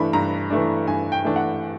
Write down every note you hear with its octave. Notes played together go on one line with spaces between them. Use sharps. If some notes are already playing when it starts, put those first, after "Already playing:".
Already playing: G2 E3 A3 D4 B5
G2 A#5
E3 A3 D4
G2 G#5
G5
E3 A3 D4
F#5